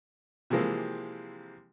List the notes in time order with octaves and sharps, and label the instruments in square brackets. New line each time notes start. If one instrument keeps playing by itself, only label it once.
[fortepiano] C3 E3 F3 G#3 A#3 C4